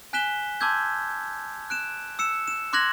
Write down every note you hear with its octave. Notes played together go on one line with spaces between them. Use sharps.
G#5 F#6 B6 E7 G7
A5 C6 D6 E6 G6 G#6
F#6 D7 E7
E6 C#7 E7
E7
C6 D6 F#6 G#6 A#6 F#7